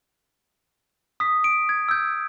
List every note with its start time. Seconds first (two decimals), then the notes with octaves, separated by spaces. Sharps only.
1.20 D#6 B6
1.44 D7
1.69 G#6
1.89 E6 G6